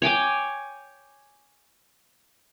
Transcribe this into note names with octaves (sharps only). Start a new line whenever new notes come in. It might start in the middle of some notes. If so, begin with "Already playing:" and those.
C#5 G5 G#5 D6